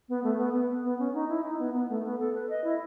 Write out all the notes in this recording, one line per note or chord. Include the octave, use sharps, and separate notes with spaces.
B3
A3
B3
B3
B3
C#4
D#4
E4
D#4
B3
B3
A3
B3
A4
B4
D#5
E4